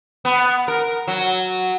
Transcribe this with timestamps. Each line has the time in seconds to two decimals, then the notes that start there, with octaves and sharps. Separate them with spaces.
0.25 B3
0.68 A#4
1.08 F#3